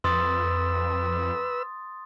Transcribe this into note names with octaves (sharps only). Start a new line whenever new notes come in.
F2 B4 C6 D#6 E6 A6